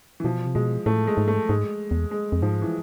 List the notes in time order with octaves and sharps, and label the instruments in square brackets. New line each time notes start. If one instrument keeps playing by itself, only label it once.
[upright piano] E3
[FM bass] B2 [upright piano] F3
[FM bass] C3
[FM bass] B2 [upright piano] G#3
[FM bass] A2 [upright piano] A3
[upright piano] G#3
[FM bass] G#2
[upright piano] A3
[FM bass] G#2 [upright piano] G#3
[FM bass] E2
[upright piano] G#3
[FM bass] F2
[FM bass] G#2 [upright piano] F3
[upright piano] E3